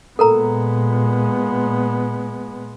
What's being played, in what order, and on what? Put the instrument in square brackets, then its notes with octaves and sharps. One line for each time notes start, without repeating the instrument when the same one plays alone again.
[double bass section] A#2 [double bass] G#3 B3 [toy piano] A4 A#4 A#5